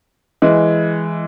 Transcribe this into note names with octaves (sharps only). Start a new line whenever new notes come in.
E3 G#3